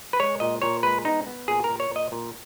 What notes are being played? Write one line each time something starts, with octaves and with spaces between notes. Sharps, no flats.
B4
G#3 C#5
A#2 D#5
A#2 C#5
G#3 B4
B3 D#4
B3
A#2 G#4
A#4
A#2
C#5
A#2
D#5
A#2